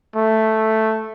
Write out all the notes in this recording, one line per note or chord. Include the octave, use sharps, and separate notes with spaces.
A3